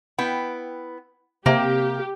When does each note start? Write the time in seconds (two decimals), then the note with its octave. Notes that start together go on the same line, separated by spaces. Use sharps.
0.18 B3 E4 G5
1.46 C3 A#3 G4